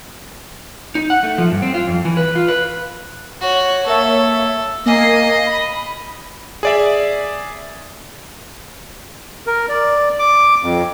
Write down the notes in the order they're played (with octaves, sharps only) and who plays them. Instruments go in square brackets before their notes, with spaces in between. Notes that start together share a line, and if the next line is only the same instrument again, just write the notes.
[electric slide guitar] D#4
F#5
A3
F3
G2
C4
F4
F2
E3
B4
F4
B4
[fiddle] F#4 C#5
[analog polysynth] A#3 C#5 E5 [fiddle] A4
[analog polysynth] A#3 G#5 C7 [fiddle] D#5
[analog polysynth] B5
[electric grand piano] G#4 D5 E5
[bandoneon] A#4
D5
D6
F2